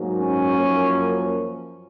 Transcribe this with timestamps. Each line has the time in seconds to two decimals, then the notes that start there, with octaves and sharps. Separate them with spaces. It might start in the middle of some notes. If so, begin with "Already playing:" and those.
Already playing: G#2 F#3 A#3
0.18 C#4
0.58 F#2 F3 A#3